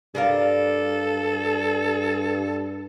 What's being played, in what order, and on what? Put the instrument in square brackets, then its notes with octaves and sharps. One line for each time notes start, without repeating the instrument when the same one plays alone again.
[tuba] G2 [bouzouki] G3 A#4 F5 [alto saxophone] A4